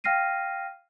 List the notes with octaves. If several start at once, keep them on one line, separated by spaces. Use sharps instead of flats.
F5 G5 F6 A#6 C7 D#7